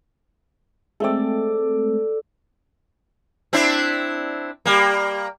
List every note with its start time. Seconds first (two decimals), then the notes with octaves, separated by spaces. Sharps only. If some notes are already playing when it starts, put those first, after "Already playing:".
1.00 G#3 A3 C4 A4 D5
3.53 C4 D4 E4
4.66 G3 A#3